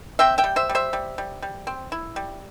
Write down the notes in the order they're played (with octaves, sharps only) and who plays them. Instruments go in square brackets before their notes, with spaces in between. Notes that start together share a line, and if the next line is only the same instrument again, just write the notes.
[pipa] C4 E5 G5
E5 G5
G3
C5 E5
G3
C5 E5
G3
G3
G3
C4
E4
G3